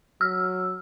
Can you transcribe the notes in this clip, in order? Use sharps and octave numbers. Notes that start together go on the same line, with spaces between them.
F#3 E6 F6